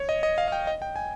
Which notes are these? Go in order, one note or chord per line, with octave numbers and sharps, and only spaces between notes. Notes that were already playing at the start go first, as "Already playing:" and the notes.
Already playing: C#5
D#5
D#5
F5
F5
G5
D#5
G5
G#5